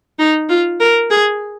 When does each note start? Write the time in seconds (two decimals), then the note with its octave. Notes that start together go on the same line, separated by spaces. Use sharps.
0.19 D#4
0.49 F4
0.80 A#4
1.10 G#4